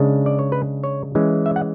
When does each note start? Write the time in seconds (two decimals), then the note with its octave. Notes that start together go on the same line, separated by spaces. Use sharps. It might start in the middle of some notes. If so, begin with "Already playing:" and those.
Already playing: C#3 G#3 D4
0.26 D5
0.39 C#5
0.52 B4
0.84 C#5
1.15 E3 G#3 C#4
1.46 E5
1.56 F#5